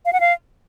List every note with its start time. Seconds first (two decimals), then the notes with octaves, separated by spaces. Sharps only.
0.05 F5
0.13 F#5
0.20 F5